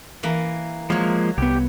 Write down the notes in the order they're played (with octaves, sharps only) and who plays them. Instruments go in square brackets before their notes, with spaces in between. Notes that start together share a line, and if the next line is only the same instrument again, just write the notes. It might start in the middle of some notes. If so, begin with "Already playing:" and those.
[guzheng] E3 A#3 B5
[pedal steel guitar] F3 G#3 A#3 [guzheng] F#3 C#5
[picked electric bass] C2 B3 [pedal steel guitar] G4